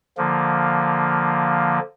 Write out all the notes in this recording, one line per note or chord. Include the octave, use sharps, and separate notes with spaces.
D3 F3 A#3